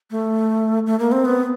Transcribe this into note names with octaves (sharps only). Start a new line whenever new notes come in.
A3
A3
A#3
C4
B3